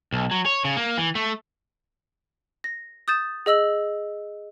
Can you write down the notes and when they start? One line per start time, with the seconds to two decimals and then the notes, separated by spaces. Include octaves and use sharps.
0.13 B1
0.31 F#3
0.46 C#5
0.64 C#3
0.77 A#3
0.98 E3
1.15 A3
2.64 A#6
3.08 D#6 G6 A6 E7
3.46 G#4 D#5 E6 F#7